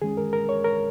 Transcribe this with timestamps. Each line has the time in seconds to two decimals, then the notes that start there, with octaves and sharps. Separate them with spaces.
0.02 D#3 G#3 C#4 G#4
0.17 A#4
0.33 A#4
0.49 C#5
0.65 A#4